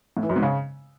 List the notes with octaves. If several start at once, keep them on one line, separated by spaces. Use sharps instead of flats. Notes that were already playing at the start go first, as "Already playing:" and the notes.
A2
E3
F#2
G#2
C#3